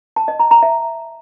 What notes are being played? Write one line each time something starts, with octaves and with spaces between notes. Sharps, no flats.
A5
D#5
A#5
A#5
E5